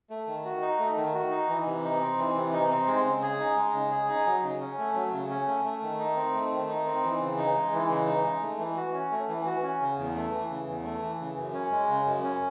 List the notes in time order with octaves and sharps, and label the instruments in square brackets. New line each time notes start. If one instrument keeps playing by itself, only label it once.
[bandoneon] A3
D#3
F#4
D#4
A3
D#3
F#4
D#4
E3
C3
D#4
C4
E3
C3
D#4
C4
G#3
C#3
G#4
D#4
G#3
C#3
G#4
D#4
F#3
C#3
C#4
A3
F#3
C#3
C#4
A3
A3
D#3
D#4
C4
A3
D#3
D#4
C4
E3
C#3
D#4
G#3
E3
C#3
D#4
G#3
A3
E3
F#4
C#4
A3
E3
F#4
C#4
C#3
E2
A3
E3
C#3
E2
A3
E3
C#3
F#2
C#4
G#3
C#3
F#2
C#4